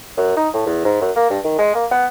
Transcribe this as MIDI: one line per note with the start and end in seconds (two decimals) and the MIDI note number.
0.17 0.33 42
0.36 0.49 63
0.54 0.62 45
0.66 0.81 40
0.85 0.99 44
1.01 1.11 42
1.16 1.26 58
1.30 1.39 43
1.44 1.53 51
1.58 1.73 56
1.75 1.85 58
1.91 2.06 59